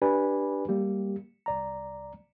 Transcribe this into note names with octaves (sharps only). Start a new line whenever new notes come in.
D4 G4 B4 D5 G#5 B5
G3 A#3 G4
C2 D5 A#5